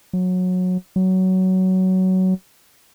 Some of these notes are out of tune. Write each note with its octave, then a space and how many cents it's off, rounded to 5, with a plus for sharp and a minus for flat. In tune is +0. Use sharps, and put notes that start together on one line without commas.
F#3 -20
F#3 +15